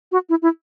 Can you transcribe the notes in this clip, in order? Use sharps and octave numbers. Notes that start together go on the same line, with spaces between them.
F#4
E4
E4